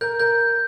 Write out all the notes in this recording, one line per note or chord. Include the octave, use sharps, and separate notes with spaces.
A#4 G6
A#4 G6